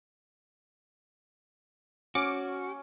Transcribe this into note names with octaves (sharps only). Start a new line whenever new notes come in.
C#4 F#4 D6